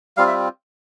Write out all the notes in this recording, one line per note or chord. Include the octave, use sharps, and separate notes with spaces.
G3 C4 F4 F5
E5